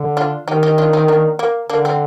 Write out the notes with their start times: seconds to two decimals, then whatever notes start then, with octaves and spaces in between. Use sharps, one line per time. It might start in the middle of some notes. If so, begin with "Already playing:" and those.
Already playing: D3
0.17 D4 F4
0.47 D#3 D#4 G4
0.63 D#4 G4
0.78 D4 F4
0.93 C4 D#4
1.08 A#3 D4
1.39 A#3
1.69 D3 A#3 D4
1.85 C4